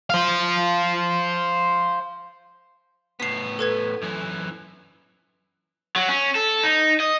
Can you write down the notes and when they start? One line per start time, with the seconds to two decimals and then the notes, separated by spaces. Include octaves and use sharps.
0.10 C5 F5
3.20 A2 B3 B6 C7
3.59 A4 B4 G#6
4.02 F#2 E3
5.96 F#3
6.09 C#4
6.35 A4
6.64 D#4
7.00 D#5